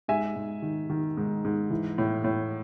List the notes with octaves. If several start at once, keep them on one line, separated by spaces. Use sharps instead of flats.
G#2 E5 G#5
G#2
D#3
D#3
G#2
G#2
E3
A2
A2